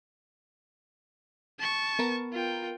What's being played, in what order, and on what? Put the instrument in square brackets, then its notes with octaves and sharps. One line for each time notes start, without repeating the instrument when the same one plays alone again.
[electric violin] A5 C#6
[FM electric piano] B3 A#4 B4
[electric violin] F4 G5